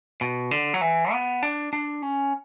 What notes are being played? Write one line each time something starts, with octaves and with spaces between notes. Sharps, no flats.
B2
D3
F#3
E3
B3
D4
D4
C#4